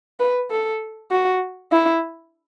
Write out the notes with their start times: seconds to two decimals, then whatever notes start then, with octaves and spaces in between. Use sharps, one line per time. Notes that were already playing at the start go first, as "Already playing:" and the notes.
0.20 B4
0.51 A4
1.11 F#4
1.72 E4